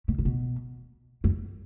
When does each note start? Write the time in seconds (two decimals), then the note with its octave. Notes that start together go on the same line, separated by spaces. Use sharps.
0.08 B2
0.18 A#2
0.25 B2
1.24 F#2